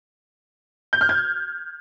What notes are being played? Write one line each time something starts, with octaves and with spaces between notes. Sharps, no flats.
G6
F6
G#6